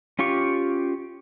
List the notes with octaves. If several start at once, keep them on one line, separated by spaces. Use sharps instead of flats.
C#4 F4 G4 C#6